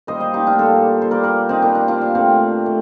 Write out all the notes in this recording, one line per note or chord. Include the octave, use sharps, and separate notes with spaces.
A#2 G3 A#3 C5 D#5
C5 D#5
D#4 G4
D4 F4
A#2 G3 A#3 A4 C5
C5
A#2 G3 A#3 A#4 D5
A#4 D5
C4 D#4
A#2 G3 A#3 D4
D4
D4 F4
D4
A#2 A3 C4
A3